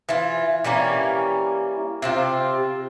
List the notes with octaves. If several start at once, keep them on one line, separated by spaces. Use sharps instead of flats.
E3 F4
E3 G3 A#3 C#4
C3 C4 F4